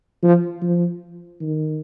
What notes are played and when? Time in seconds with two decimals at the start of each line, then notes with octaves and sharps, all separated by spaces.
0.23 F3
0.62 F3
1.41 D#3